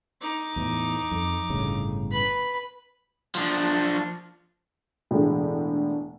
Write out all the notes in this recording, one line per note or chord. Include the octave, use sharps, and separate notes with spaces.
D#4 D6
E2 A2 E3
F2
G1 A2 C#3
B4 B5
F3 D4
E1 A2 D3 G#3